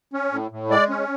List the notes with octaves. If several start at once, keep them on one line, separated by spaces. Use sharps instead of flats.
C#4
A2
A2
G#3 D5
C#4